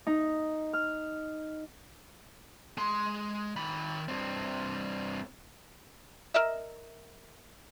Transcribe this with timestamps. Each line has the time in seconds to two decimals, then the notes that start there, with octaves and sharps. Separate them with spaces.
0.07 D#4
0.73 F6
2.77 G#3 C6
3.56 D#3 B5
4.08 G2 C4
6.34 A#4 D#5 E5